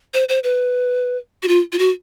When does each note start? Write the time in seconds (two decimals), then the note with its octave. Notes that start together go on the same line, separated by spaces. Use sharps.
0.14 C5
0.29 C5
0.44 B4
1.43 F#4
1.48 F4
1.72 F4
1.79 F#4